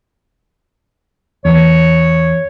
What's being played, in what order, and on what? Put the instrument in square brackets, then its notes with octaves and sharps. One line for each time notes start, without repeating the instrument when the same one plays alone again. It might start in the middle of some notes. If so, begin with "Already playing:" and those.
[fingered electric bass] E2 [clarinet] C#5